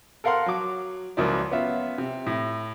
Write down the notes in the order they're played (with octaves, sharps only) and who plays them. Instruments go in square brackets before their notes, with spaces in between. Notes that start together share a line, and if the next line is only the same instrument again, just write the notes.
[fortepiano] A4 A#4 F5 F#5 C6 F6
F#3 D6
C#2 F3 F#3 A#3 E4 D5
B3 C#4 F4 E5
C3
A2